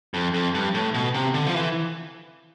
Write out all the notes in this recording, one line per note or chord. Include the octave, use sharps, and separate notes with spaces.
F2
F2
G2
A2
B2
C3
D3
F3
E3